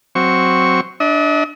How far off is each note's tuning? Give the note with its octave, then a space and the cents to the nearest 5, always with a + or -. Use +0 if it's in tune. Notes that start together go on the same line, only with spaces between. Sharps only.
F#3 +0 C4 +0 C#6 +0
D4 +0 D#5 +45